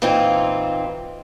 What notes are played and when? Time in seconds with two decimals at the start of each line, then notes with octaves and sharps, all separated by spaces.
0.02 A#2 E3 C4 D#4 F4